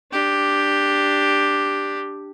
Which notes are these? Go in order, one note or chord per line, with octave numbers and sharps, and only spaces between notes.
D4 G4